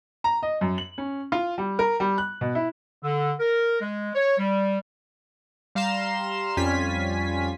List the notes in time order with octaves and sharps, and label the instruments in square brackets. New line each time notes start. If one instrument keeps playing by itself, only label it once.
[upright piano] A#5
D#5
F#2
F#7
C#4
F4
G3
A#4
G3
F#6
B2
E4
[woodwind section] D3
A#4
G#3
C#5
G3
[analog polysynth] G3 F5 A#5 C6 E7
F2 G3 C#4 F4 G#5 B6